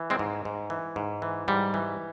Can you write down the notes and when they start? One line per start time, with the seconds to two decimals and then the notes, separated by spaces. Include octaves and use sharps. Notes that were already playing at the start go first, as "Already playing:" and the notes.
Already playing: E3
0.10 G#3 C4
0.19 G#2
0.45 G#2
0.70 E3
0.96 G#2
1.22 E3
1.48 G#2 G3
1.74 E3